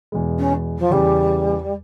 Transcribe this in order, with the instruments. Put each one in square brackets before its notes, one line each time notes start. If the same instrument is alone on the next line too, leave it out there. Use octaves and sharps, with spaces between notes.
[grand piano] E2 B2 G#3
[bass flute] C#4
F3
[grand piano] E2 C#3 E3 [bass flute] G3